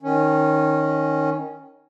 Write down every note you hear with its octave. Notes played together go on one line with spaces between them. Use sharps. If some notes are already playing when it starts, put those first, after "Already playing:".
D#3 C#4